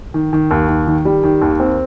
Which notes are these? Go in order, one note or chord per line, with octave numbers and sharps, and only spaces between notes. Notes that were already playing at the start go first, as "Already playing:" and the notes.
D#3
D#3
D#2
D#3
D#3
G3
D#3
D#2
C4